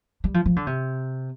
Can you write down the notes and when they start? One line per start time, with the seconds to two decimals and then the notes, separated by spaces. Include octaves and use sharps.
0.24 G3
0.34 F3
0.46 F3
0.56 D3
0.67 C3